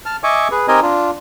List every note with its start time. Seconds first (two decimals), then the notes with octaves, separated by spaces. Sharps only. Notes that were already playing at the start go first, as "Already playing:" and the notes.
0.06 A5 F6
0.23 D#5 E5 G#5 C#6 D6
0.51 G#4 B4
0.68 C4 D#4 G4 A#4 D#5 G#5
0.82 D4 F4